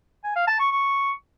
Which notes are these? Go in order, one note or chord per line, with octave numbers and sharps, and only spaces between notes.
G#5
F5
A5
C#6
C#6